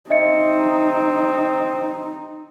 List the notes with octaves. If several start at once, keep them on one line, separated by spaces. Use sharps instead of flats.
C4 D#4 D#5 E5 C#7